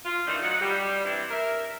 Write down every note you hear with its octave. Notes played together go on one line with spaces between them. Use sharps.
F4
A#2 D#3 E3 A3 D4 D#4
F#3 D#4 F#5
G3
E3 G3 C4 D4 E4
A#4 E5